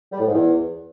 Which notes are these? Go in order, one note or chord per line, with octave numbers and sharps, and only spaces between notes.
G3
A2
G#2
E2